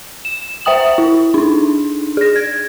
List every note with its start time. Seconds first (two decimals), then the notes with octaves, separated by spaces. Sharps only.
0.25 E7
0.65 C5 E5 G5 D#6 F#7
0.98 E4
1.34 D4 D#4
2.17 G#4 A#6
2.36 G#6